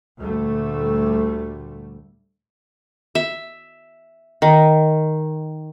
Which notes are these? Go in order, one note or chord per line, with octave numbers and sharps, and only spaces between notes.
D2 A#2 G3 A3
E5
D#3